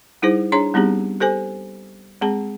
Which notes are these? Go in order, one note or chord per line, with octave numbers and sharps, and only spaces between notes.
G3 D#4 E4 G#4 C5
D4 G#4 C#5 A#5 C6
G3 B3 C4 D#4 G4 G#4
G4 A4 C5 G#5
G#3 C4 G#4 A5